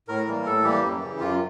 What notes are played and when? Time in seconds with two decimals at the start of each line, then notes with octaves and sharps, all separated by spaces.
0.08 A2 A#4
0.27 E3 G3 A#3
0.45 A2 A4
0.64 E3 G3 A#3 G4
0.83 F#2
1.02 C#3 E3
1.20 F#2 F4